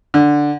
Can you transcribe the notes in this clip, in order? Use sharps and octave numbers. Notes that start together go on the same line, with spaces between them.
D3